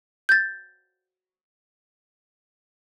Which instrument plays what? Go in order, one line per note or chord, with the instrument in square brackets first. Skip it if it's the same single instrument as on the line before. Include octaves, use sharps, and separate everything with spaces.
[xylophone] G6 A6